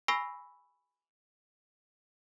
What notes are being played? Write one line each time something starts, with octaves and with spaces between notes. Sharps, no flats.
G#5 B5 C#6 E6 A#6 C7